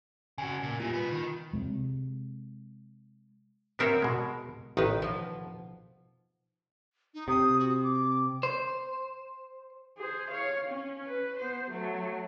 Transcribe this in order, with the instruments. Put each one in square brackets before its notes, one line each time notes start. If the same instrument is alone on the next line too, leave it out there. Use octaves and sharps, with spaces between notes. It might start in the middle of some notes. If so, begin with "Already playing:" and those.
[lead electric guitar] C#3 F#4 [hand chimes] G#5
[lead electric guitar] A#2
[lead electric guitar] A#2 G3 [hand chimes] F4
[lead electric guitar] B2 B4
D#3
[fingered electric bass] C3 G#3
[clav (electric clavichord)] B3 C4 C#5 [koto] F#4 A#4 E5
[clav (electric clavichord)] B2 G#3
[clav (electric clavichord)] A1 D#3 [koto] D#4 B4
[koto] B2 F3
[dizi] D#4
[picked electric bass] C3 [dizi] D#6
[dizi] F#4
D6
[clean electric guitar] C5
[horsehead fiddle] G#4 C5
C#5 F5
C#4
B4
B3 C5
F#3 A3